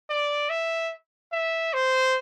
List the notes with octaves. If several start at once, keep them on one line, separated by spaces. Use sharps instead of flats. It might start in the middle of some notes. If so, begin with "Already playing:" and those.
D5
E5
E5
C5